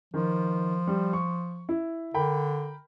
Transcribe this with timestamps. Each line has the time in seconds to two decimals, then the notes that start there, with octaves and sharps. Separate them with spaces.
0.14 D#3 F3
0.87 G3
1.13 C#6
1.69 E4
2.14 D3 A#4 G5 B5